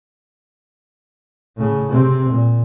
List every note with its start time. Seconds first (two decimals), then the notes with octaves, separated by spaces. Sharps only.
1.57 A2 C#3
1.89 C3 C4
2.29 A#2